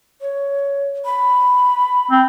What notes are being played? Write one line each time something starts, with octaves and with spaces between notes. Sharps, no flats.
C#5
B5
C4